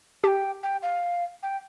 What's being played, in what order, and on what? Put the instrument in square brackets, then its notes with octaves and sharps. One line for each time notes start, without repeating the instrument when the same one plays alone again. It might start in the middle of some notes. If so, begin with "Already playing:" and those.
[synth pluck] G4 [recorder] G5 A5
[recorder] G5
F5
G5